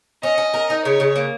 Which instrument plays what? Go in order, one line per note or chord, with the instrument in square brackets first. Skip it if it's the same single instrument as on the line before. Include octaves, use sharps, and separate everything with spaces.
[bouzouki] C#4 [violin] D#5
[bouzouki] C#4
A#4
D#4
[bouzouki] C#3 [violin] C#5
[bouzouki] C#3
A#3